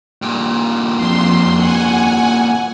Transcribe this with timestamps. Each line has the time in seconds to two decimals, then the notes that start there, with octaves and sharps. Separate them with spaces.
0.22 G2 A#2
0.96 F2 C6
1.57 F#5 G#5